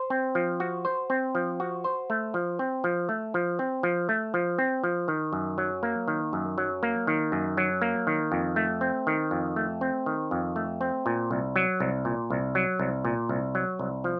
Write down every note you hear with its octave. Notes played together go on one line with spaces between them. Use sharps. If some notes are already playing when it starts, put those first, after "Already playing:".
Already playing: C5
C4
F3
F#4
C5
C4
F3
F#4
C5
A3
F3
C4
F3
A3
F3
C4
F3
A3
F3
C4
F3
D#3
F#2
F#3
A#3
D#3
F#2
F#3
A#3
D#3
F#2
F#3
A#3
D#3
F2
A3
C4
D#3
F2
A3
C4
D#3
F2
A3
C4
A#2
C2
F#3
C2
A#2
C2
F#3
C2
A#2
C2
F#3
C2
F3